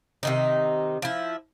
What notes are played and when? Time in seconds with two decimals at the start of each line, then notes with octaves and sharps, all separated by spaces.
0.23 C3 D#3 D#4
1.02 F3 E4